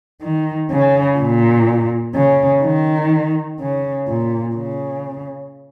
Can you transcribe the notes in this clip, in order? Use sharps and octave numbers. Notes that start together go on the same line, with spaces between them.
D#3
C#3
A#2
C#3
D#3
C#3
A#2
C#3